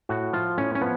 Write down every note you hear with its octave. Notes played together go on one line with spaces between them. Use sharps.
A2 F#4
F3 F4
A2 C#4
C#4
F3 B3